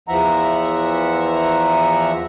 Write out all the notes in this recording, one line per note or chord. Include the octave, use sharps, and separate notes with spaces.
E2 E3 F3 E5 F#5 A#5